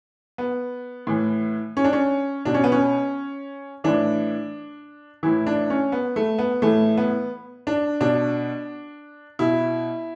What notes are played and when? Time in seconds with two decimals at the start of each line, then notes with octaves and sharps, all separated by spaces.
0.38 B3
1.07 A2 E3
1.77 C#4
1.84 D4
1.93 C#4
2.45 B2 D4
2.54 C#4
2.64 B3
2.72 C#4
3.84 A2 E3 D4
5.23 A2 E3 E4
5.47 D4
5.70 C#4
5.92 B3
6.16 A3
6.39 B3
6.62 A2 E3 A3
6.97 B3
7.67 D4
8.01 B2 D4
9.39 B2 E4